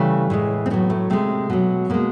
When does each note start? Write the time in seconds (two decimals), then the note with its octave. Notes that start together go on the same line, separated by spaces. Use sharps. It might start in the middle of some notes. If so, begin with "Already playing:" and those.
Already playing: C#3 E3 G3 A3
0.30 A2 E3 G#3
0.66 C4
0.70 A2 F#3 B3
0.90 A3
1.10 C3 F3 G#3 A3
1.50 B2 F#3
1.90 B2 G#3 A#3